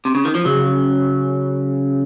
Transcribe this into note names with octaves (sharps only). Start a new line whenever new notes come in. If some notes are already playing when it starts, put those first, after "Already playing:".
C3
C#3
D#3
F3
C#3 F#3